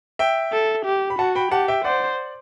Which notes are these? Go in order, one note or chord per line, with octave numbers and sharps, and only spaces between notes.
E5 G5
A4
G4
B5
F#4 F#5 A5
G5 B5
G4 F#5 A5
E5 G5
C5 D5 F#5